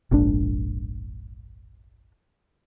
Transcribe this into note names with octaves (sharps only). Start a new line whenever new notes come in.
F1 A#1 G#2 D4